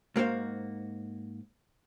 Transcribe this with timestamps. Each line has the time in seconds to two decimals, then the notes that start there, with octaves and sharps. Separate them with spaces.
0.16 G#2 A#3 F#4 C5 F5